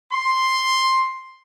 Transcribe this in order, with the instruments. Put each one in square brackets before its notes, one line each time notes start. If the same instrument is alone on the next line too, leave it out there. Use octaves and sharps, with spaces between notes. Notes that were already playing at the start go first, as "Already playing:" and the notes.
[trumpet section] C6